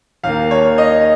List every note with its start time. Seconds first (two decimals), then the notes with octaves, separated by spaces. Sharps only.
0.24 D#2 D#3 A#3 F5
0.51 C#5
0.78 D#5